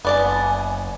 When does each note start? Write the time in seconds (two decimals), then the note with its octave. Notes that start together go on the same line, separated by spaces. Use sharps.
0.05 F#1 B3 D5 G#5 A5